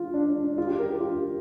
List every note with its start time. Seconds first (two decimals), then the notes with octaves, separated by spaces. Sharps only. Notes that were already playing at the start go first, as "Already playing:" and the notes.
Already playing: F4
0.14 D4
0.29 D4
0.43 D4
0.58 F4
0.68 G4
0.79 A#4
0.89 G4
1.00 F4